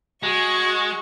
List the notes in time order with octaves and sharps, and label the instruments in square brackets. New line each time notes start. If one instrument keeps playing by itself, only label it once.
[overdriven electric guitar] G#3 [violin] F#4 C#6